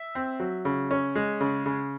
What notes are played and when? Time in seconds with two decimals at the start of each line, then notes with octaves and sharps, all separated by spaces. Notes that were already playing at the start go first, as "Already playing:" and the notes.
Already playing: E5
0.15 C4
0.40 F#3
0.65 C#3
0.91 C#4
1.15 G#3
1.41 C#3
1.66 C#3